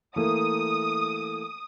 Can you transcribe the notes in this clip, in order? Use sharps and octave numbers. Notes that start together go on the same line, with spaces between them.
E3 A3 A#3 D#6